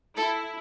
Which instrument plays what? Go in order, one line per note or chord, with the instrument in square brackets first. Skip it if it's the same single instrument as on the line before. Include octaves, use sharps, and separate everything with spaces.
[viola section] E4 [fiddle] A4